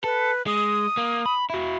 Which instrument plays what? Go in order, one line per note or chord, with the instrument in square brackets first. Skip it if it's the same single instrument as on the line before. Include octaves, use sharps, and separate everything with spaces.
[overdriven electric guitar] A4 [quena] B4
[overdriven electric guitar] G#3 [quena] D#6
[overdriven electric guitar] A#3
B5
E4 F#4